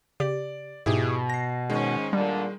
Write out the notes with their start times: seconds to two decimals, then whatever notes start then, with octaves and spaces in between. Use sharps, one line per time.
0.20 C#3 G4 D5
0.86 G#2 B2 E4 G4 G#4
1.30 A#6 C7
1.70 G#2 D#3 G#3 C#4
2.13 A#2 D3 G3